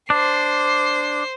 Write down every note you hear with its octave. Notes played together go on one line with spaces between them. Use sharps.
D4 C5 C7